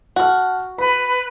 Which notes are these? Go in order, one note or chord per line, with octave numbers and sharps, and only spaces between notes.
F#4 F#5 A5 F6
B4 B5